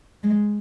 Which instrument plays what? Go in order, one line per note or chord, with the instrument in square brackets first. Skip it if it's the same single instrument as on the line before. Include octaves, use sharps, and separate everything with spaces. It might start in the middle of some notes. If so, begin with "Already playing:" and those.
[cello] G#3